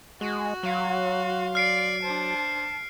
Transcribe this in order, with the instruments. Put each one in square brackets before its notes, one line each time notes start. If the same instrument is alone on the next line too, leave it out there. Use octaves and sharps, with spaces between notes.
[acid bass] G#3 [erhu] F#4
[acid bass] F#3 [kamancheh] F5 C6
[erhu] D5 [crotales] F6 C7 D7
[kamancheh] D4 C5 [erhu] A5